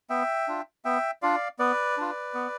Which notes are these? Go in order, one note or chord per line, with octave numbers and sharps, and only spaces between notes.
B3 E5 G5
D4 F4
B3 E5 G5
D4 F4 D5 F5
B3 B4 D5
D4 F4
B3